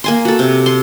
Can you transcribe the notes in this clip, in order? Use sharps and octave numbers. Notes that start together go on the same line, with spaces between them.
A#3 G#5 C6
F#4 A4
C3
C6